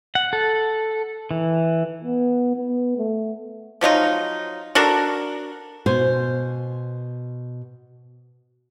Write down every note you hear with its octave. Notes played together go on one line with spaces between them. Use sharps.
F#5
A4
E3
B3
B3
A3
F3 F#3 D#4 F4
D4 F#4 A4 A#4
B2 C5 G#5